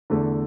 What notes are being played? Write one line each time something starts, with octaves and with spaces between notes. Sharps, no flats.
E2 D3 A3